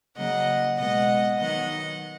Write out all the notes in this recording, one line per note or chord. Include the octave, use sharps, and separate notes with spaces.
C#3 F#3 A#3 D#5 F#5
B2 G#3 B3 D#5 F#5
D#3 F#3 B3 D#5 F#5